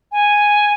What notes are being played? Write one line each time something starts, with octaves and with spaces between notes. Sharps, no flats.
G#5